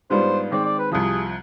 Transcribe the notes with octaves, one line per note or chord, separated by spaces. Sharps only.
G#2 G3 B3 D4 F4 C5
D#3 G#3 C4 D5
D5
B4
C2 C3 F3 G#4